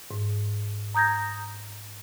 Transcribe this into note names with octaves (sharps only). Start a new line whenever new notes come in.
G#2
A#5 D#6 G6 G#6 A#6